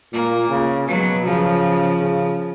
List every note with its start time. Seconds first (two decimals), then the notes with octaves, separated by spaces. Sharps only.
0.13 A#2 A#3
0.50 C#3
0.88 B2 F#3
1.25 C#3 F3
2.00 C#3